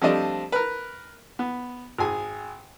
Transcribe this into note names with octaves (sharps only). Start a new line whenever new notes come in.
F3 G3 A3 C4 D4 D#5
A#4 B4
B3
G#1 G#4 G#5